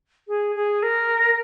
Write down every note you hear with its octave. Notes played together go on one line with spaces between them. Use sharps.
G#4
G#4
A#4